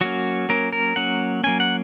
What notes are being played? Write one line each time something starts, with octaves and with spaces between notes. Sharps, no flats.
F#3 A#3 C#4 F#4
F#3 A#3 C#4 A#4
A#4
F#3 A#3 C#4 F#5
F#3 A#3 C#4 G#5
F#5